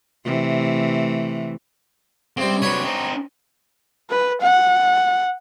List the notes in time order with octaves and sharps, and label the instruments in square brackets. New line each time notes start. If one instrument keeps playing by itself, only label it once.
[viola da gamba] C3 E3 A3
[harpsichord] C#2 C3 G3 [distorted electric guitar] C4
[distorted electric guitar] C3 F#3 [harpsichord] D4 B4 C#5
[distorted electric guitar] C4 D#4
[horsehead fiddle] B4
F#5